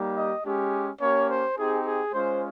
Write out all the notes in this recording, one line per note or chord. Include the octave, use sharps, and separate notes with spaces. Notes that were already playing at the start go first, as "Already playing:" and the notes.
Already playing: G3 A#3 D#4 G4
D#5
G#3 C#4 G4
A#3 C#4 G4 C#5
C5
C4 D#4 G4 G#4
G#4
G#3 C#4 F4 C5